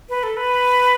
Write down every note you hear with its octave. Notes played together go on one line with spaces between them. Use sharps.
B4
A4
B4